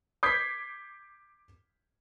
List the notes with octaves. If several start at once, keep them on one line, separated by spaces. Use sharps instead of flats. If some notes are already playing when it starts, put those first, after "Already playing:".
D6 G6 G#6 B6 C7